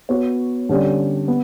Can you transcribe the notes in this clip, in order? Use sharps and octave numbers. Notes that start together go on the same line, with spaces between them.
B3 F#4 C#5
D3 G3 C#4 G4 D5
B3